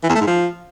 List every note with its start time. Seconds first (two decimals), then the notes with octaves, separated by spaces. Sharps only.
0.03 E3
0.09 E2
0.15 A3
0.21 G#2
0.27 F3